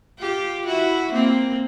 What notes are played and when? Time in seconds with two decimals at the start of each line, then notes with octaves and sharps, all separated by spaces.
0.20 F4 G4
0.66 E4 F#4
1.12 A#3 C4